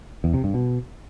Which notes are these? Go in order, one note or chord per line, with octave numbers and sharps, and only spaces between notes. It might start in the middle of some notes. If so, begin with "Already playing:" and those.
E2
C3
G2
B2